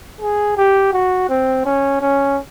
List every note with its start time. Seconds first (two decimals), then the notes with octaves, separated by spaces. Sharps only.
0.21 G#4
0.57 G4
0.93 F#4
1.29 C4
1.65 C#4
2.01 C#4